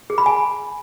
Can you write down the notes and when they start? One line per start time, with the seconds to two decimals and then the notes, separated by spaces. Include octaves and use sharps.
0.10 G#4
0.18 B5
0.26 G#5